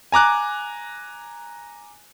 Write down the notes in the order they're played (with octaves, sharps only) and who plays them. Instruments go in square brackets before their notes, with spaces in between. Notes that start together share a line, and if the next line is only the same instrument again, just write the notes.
[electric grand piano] G#5 A#5 D6 F#6